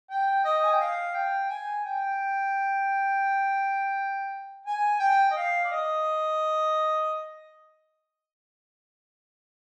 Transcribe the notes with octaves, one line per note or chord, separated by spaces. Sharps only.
G5
D#5
G#5
G5
F5
G5
G#5
G5
G#5
G5
D#5
F5
D5
D#5